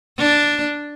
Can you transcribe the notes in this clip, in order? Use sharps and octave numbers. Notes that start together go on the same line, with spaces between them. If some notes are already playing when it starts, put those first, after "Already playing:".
D4